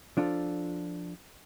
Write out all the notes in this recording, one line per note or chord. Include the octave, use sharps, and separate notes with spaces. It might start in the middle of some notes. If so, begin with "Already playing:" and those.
F3 D4 F4 A4